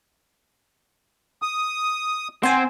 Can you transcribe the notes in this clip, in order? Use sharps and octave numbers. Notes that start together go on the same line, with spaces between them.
D#6
C4 F#5 G#5 C6